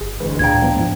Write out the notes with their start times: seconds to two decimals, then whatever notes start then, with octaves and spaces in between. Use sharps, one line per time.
0.01 G1 G#4
0.20 A1 D2 G#3 B4
0.39 D2 A#2 C#3 D4 F5 G5 A#5 G#6
0.62 F3 G#3 B3
0.76 G#2 F3